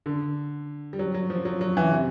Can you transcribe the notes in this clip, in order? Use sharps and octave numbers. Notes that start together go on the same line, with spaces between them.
D3
G3
F#3
F#3
F3
F#3
F#3
E3
C3